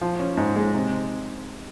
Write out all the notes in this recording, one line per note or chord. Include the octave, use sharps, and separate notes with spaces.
F3
C#4
G#2
G#3
C3